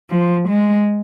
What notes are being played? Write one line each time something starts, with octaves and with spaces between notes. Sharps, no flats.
F3
G#3